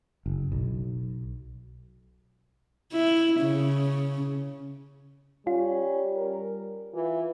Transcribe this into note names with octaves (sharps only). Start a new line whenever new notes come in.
F#1
B1
E4
C#3
G3 C#4 F4
A#4
E3 F4